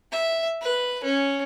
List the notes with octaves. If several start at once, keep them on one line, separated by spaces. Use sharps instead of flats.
E5
B4
C#4